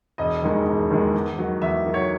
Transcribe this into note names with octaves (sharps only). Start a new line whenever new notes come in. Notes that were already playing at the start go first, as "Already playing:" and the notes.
E1 D#5
D#2 D#3 G#3
E1
D#2 D#3 G#3
E2
D#3 F#3
E2 E5
D#3 F#3
C#5